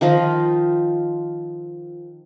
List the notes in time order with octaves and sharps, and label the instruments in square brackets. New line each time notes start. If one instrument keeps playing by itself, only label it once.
[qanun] D#3 F3 F4 D#5